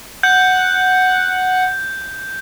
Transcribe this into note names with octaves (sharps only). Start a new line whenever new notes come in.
F#5 G6